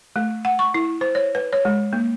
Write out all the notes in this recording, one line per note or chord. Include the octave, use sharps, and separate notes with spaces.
A3
F#5
C#6
E4
C5
C#5
B4
C#5
G#3
A#3